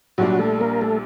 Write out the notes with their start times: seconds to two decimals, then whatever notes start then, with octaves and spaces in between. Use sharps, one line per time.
0.18 A#1 A#2 F#3 G3 D4 F#4
0.39 A3 A4
0.61 A#3 A#4
0.81 A3 A4